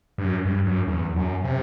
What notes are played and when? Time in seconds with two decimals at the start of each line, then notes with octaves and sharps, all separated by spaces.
0.18 G2
0.24 F#2
0.45 G2
0.67 F#2
0.87 E2
1.16 F#2
1.44 C3